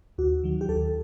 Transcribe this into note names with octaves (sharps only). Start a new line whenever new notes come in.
D#2 F#4
D#3 F#3
G4
D#2 A4